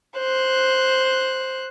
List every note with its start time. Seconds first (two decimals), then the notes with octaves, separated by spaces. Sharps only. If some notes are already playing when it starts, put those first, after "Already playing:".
0.18 C5 F#6